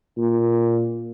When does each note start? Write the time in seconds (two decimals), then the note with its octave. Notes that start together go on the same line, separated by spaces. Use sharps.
0.18 A#2